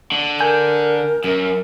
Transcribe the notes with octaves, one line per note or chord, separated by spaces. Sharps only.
D3
A#4 G#5 G6
F#2 A#4